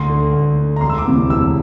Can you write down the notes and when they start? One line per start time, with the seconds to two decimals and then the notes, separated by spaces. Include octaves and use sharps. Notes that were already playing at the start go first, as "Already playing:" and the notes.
Already playing: D2 C6
0.09 D3
0.33 D2
0.57 D3
0.76 A#5
0.81 E1 C6
0.90 E6
0.98 D6
1.05 D2 C3 E3
1.29 E1 E6